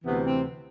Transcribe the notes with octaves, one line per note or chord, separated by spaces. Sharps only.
D2 C3 E3 B3
C4